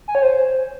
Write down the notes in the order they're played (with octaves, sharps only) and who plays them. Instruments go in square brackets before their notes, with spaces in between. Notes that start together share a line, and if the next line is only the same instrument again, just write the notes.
[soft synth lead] G#5
C#5
C5